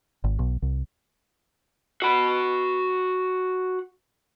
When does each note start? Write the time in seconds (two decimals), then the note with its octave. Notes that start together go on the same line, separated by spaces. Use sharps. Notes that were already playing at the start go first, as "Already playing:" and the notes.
0.24 G#1
0.39 B1
0.62 C2
2.02 F#4 B5